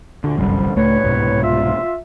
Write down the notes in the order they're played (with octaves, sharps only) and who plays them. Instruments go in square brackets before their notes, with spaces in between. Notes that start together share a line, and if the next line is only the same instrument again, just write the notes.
[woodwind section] D2 A#2 F#4 [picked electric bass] D3
[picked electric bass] G1 C2 F#2 [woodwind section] D3 F3 G3
[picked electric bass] C#2 A3 [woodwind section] A2 B4 C#5
[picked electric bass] C2 G#2 B2
[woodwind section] F4 E5